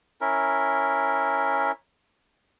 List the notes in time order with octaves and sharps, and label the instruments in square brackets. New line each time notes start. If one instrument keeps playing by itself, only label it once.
[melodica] C#4 E4 A#4